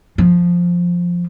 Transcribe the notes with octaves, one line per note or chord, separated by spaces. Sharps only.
F3